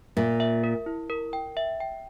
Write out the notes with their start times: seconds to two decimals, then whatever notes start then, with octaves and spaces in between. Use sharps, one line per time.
0.17 A#2 E5
0.40 E5
0.64 A#4
0.86 E4
1.10 A#4
1.33 G5
1.57 E5
1.80 G5